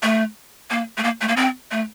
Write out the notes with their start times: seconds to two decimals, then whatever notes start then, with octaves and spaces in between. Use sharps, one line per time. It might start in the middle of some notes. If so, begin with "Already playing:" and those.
0.03 A3
0.70 A#3
0.98 A3
1.04 A#3
1.21 A3
1.28 A#3
1.37 C4
1.71 A3